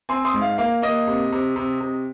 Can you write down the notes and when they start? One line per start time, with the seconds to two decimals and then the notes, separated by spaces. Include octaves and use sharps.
0.09 C4 G#5 C6
0.25 C6 D#6
0.34 G#2
0.41 F5
0.58 A#3 F5
0.82 A#3 D#5
1.08 C3
1.33 C3
1.56 C3
1.81 C3